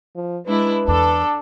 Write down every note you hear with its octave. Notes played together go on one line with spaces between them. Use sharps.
F3
G#3 D4 E4 B4
E2 D4 A4